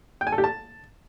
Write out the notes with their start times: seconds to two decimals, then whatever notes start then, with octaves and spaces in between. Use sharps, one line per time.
0.21 G5
0.27 G#5
0.32 A4
0.38 G4
0.44 A5